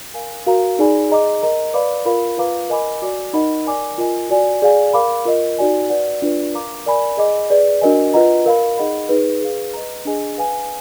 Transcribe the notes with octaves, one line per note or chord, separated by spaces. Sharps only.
A#4 F5 G#5
F#4 A#4 F5 A#5
D#4 G#4 D5 G#5 B5
G#4 D#5 A#5 D6
A#4 D#5 A#5
B4 D5 F5 B5 D6
F4 A#4 F5 B5
F4 B4 F5 A#5 D6
A#4 D#5 G#5 B5 D6
F#4 D5 G#5 D6
D#4 A#4 D#5 F#5 B5
A#4 D5 G#5 D6
F4 A#4 D#5 G#5
F#4 D5 G#5
G#4 D5 F5 G#5
A#4 F5 B5 D6
F4 A#4 D#5
D#4 F#4 D5 G#5
F#4 B4 D5 F#5
D4 F4 B4 D5
A#4 F5 A#5 D6
A#4 D5 G#5 B5
G#4 D#5 G#5 B5 D6
G#4 B4 D5
D4 F#4 A#4 D#5 G#5
F4 B4 D#5 F#5 A#5
A#4 F5 B5
D#4 G#4 D#5 F#5 B5
D#4 G#4 B4
G#4 B4 F5
B4 D#5 A#5
D4 G#4 D#5 G#5
B4 F5 G#5